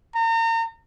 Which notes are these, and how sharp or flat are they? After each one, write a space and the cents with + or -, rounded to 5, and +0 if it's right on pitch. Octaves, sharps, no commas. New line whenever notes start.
A#5 -35